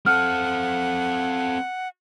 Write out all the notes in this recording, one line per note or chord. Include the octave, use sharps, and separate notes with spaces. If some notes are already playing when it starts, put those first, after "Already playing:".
C4 A4 F#5 F6